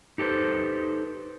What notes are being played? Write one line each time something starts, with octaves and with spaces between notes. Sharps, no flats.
D#4 G4 A4 B4 C5